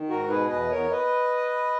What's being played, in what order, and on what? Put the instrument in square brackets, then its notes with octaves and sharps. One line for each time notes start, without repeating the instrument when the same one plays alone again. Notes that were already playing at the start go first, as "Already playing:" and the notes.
Already playing: [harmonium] D#3
G#2 F#4 A#4
B2 G#4 B4
E2 B4 D#5
E2 A#4 C#5
B4 D#5